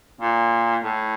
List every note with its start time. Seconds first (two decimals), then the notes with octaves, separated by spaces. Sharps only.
0.21 A#2
0.83 A2